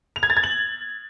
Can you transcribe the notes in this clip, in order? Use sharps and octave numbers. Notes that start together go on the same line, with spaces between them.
F7
G#6
A6
G#6
F#7